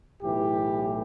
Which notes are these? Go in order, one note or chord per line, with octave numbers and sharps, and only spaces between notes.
B1 A2 E3 G4